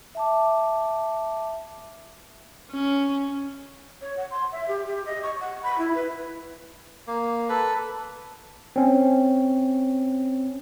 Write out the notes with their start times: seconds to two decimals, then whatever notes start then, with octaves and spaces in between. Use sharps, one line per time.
0.15 E5 A5 D6
2.72 C#4
4.01 C#5
4.17 F#5
4.31 C6
4.52 E5
4.68 G4
4.87 G4
5.06 D#5
5.23 C#6
5.40 F#5
5.63 B5
5.78 E4
5.95 B4
7.07 A#3
7.49 A4 B4
8.76 C4 C#4